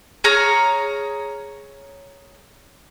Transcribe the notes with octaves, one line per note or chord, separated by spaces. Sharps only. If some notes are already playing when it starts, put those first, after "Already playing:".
G#4 C#5 A#5 F6